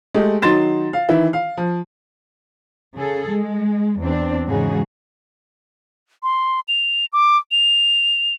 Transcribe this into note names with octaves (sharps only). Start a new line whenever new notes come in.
G#3 A3 G4
D#3 F#3 D#4 C6 A6 E7
F5
D#3 E3 E4
F5
F3
C#3 G#4 A4
G#3
E2 C4 D4
G#2 C#3 E3 D#4 F#4 G#4
C6
F7
D6
F7